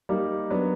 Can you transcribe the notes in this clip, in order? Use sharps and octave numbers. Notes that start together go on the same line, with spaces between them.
G3 A#3 D#4 G4
F#3 B3 D4